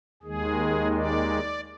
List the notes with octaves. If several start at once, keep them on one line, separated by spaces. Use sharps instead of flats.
D#2 D#3 G#3 G#4
D5